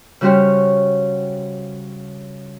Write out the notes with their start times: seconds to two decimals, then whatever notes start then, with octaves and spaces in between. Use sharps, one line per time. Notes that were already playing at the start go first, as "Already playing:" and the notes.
0.21 C#3 G3 F#4 G4 C5 C#5